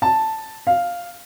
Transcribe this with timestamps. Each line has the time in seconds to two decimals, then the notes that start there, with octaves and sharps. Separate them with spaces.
0.02 A5
0.67 F5